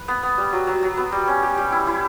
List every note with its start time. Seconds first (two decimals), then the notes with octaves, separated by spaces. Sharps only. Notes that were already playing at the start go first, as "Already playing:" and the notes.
Already playing: B4
0.08 B3
0.23 B3
0.38 G3
0.53 F#3
0.67 F#3
0.83 F#3
0.97 B3
1.12 G3
1.27 C#4
1.43 G4
1.57 G3
1.72 E4
1.87 E4